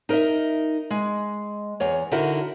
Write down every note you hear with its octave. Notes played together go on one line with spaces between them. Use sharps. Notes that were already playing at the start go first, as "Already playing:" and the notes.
D#4 A#4 B4 D#5 E5
G#3
E2 C#5
D3 D#4 E4 F#4 A#4 E5